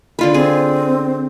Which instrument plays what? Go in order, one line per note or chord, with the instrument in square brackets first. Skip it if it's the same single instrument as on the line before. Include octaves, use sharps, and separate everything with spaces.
[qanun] D3 F4 B4
[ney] C4 [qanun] G#4